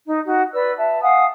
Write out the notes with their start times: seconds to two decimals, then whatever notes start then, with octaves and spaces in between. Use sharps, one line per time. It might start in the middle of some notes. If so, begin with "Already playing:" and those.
0.06 D#4
0.24 D#4 F#4
0.52 B4 D5 E6
0.77 E5 A5
1.01 F5 F#5 G#5 D#6